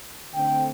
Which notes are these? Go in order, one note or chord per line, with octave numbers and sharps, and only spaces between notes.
D3 A3 C4 G5